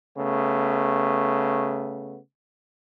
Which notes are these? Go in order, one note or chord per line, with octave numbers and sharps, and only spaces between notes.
C#3 A3 B3